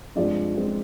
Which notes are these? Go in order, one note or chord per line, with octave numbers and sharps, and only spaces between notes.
G2 F3 G#3 C4 D5
G2 F3 G#3 C4